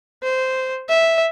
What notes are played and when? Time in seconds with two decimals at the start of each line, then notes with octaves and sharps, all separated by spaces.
0.23 C5
0.89 E5